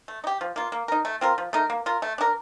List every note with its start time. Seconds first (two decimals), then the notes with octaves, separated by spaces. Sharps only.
0.08 A3
0.24 D#4
0.27 G4
0.41 F3
0.56 A#3 F4
0.72 A#3
0.88 D#4 A#4
1.05 A3
1.21 C4 F4 A#4
1.38 F3
1.53 A3 D#4 A#4
1.70 A#3
1.86 F4 A#4
2.02 A3
2.18 D4 G4 A#4